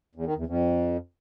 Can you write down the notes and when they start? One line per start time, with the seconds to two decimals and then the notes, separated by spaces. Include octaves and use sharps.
0.15 E2
0.26 D#3
0.36 E2
0.47 F2